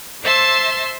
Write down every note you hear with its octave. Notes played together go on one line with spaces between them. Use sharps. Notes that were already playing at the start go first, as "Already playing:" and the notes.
C5 E5 A5 C6 E6